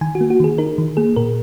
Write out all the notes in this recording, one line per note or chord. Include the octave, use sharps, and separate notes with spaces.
D#3 G#5
F#4
A#3
F#4
D#3 G#4
D#4 A#4
D#3
A#3 G#4
A#2 A#4